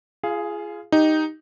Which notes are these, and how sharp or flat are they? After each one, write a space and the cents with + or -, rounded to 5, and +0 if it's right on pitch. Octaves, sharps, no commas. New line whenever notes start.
F4 -35 G#4 +5 F5 +0
D#4 +0 G4 +0